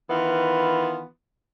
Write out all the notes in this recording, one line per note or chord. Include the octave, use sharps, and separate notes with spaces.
D#3 E3 B3 F4